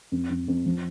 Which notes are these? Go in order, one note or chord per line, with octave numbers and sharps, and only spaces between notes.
F2
F2
F2
F3